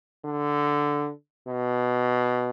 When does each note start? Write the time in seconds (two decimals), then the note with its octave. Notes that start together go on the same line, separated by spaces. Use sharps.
0.24 D3
1.47 B2